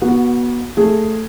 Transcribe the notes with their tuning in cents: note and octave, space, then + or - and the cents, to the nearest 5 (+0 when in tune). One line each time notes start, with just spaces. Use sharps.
B3 -30 F#4 +0
A3 +5 G#4 +0